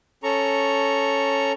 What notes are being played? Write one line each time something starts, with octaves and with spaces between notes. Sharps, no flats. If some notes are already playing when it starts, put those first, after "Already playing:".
C#4 A4 A#5 C#6